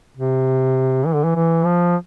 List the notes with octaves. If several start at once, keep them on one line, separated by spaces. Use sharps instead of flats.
C3
E3
D3
E3
E3
F3